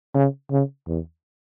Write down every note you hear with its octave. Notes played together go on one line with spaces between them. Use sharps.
C#3
C#3
E2